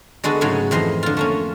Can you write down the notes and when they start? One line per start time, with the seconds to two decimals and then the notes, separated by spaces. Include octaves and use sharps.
0.24 D3 G#3 B3 F#4 A4
0.41 G#2 C#3 F#3 A3 C#4 G#4
0.71 F2 E3 C5 D#5 C6
1.03 D3 F4
1.17 A3 A#3 C#4